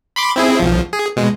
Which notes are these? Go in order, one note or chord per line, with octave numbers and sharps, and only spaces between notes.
B5 C6 D6
C4 E4 G#4
B1 F3
G#4
B2 G#3